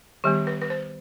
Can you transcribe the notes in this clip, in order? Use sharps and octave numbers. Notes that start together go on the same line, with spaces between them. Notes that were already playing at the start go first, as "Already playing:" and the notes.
D#3 G3 B3 G4
B4
B4
C5